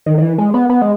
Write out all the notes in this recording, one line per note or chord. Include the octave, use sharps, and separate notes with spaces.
D#3
D#3
E3
G#3
B3
B3
G#3